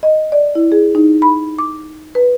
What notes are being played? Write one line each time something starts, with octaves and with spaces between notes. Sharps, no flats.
D#5
D5
E4
G#4
D#4
B5
D6
B4